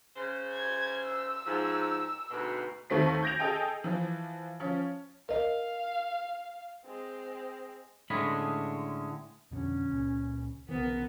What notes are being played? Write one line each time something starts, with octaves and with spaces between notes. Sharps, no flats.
C#3 C5
G#6
E6
G#2 F3
D2 G#2 B2
D#2 D#3 A3 C4 B6
G6 G#6 A#6 D7 F7
G#4 A4 D#5 G5 G#5
E3 F3
F3 C#4
A#4 D#5 F5
G#3 C4
A2 D3 G#3 C#4 B5
F2 B2 D3 C#4
C#2 A#2 C#3
B1 C#3 E3 B3 A#4